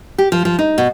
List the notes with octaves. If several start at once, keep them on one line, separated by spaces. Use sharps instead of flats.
G4
F3
F3
D#4
B2